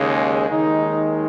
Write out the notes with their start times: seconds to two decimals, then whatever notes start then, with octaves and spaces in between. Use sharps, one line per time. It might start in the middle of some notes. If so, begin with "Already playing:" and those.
Already playing: D#2 C#3 G#3
0.49 D#2 D#3 G#3 D#4